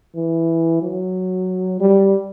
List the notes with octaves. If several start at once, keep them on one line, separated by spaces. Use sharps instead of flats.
E3
F#3
G3